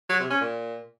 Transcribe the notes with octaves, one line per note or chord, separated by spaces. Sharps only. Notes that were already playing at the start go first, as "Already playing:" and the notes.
F#3
C3
C#4
A#2